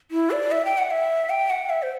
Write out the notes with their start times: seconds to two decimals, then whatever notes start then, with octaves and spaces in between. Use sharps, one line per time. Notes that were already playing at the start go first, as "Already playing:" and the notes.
0.11 E4
0.31 D5
0.52 E5
0.65 G5
0.78 F#5
0.91 E5
1.30 G5
1.50 F#5
1.70 E5
1.83 C5